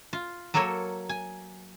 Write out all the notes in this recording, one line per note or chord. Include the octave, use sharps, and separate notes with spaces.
F4
F#3 A#3 A4 A#4 C#5
G#5